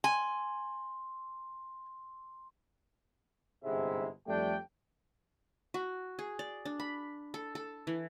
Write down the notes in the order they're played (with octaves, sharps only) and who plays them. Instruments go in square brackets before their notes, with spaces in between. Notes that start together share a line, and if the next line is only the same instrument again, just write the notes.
[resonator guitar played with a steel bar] G#5 [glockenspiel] C6
[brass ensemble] G1 G#2 C3 G#3 E4 E5
F2 G3 A3 D4 G5
[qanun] F#4
G#4
D5
D4
B5
A4
A4
E3